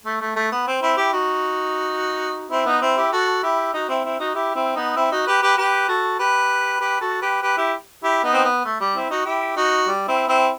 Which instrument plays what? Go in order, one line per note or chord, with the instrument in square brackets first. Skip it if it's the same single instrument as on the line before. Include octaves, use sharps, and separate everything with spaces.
[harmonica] A3
A3
A3
B3
C4
C4 E4
E4 G4
D#4 F#4
C4 E4
B3 D#4
C4 E4
E4 G4
F#4 A4
E4 G4
D#4 F#4
C4 E4
C4 E4
D#4 F#4
E4 G4
C4 E4
B3 D#4
C4 E4
D#4 F#4
G4 B4
G4 B4
G4 B4
F#4 A4
G4 B4
G4 B4
F#4 A4
G4 B4
G4 B4
E4 G4
E4 G4
B3 D#4
C4
B3
A3
G3
C4 E4
D#4 F#4
E4 G4
D#4 F#4
G3
C4 E4
C4 E4